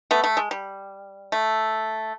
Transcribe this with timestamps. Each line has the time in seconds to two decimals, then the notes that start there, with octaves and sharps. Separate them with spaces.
0.11 A3 B3
0.24 A3
0.37 G#3
0.51 G3
1.32 A3